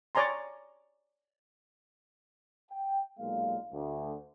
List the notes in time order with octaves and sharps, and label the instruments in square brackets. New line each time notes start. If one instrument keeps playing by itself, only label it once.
[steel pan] C#5 D5 G#5 A#5 C6
[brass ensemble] G5
B1 A#2 G#3 A#3 F5
D2